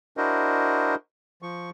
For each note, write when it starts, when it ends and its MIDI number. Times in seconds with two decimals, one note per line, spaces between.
0.17 0.95 62
0.17 0.95 64
0.17 0.95 66
0.17 0.95 70
0.17 0.95 72
0.17 0.95 75
1.42 1.70 53
1.42 1.70 85